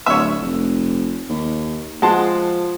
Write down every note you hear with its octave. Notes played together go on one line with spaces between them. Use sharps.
D1 C#5 E5
F1
D#2
F3 G#3 F#5 A5 C6